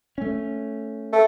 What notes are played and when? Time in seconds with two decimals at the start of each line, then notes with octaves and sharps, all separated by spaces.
0.18 A3 C#4
1.13 A3